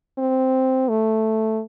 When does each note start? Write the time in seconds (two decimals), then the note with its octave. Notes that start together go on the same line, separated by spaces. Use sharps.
0.18 C4
0.89 A3